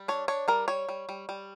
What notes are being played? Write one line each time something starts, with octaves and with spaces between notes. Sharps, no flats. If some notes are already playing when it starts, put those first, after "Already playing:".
Already playing: G3
D4 C#5
D4 C#5
G3 A#4
G3 C#5
G3
G3
G3